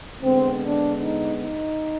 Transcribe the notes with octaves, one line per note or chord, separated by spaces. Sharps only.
D3 G#3 B3 C4
D4
D#4
D#4